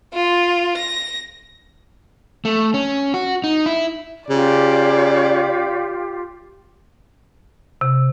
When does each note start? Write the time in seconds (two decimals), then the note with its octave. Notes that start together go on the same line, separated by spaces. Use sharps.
0.14 F4
0.77 A#6
2.45 A3
2.74 C#4
3.14 F#4
3.44 D#4
3.66 E4
4.30 C#3 F4 G4 D5
7.81 C3